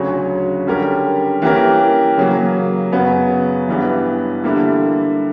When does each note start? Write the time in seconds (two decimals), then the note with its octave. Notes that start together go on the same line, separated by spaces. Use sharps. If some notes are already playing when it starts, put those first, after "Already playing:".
Already playing: D2 C#3 F#3 C#4 F#4
0.67 D3 G3 C#4 G4 A#4
1.42 E3 A#3 C#4 G4 A#4
2.17 C#3 F#3 A#3
2.92 F#2 C#3 F#3 B3
3.68 G2 E3 G3 B3
4.43 D3 G3 A#3 E4